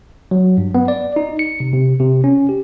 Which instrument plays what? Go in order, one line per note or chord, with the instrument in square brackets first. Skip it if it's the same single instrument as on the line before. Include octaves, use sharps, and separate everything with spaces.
[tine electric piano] F#3
G2
B3
D5
D#4
C#7
C3
C3
C3
C#4
G4